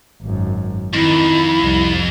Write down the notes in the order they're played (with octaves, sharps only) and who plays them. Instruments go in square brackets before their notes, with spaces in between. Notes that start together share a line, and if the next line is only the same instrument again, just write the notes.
[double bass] G#1 F#2
[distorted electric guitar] F2 [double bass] D#3 [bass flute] E4
[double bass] C2